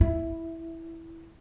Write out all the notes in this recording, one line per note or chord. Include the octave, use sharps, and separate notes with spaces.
E4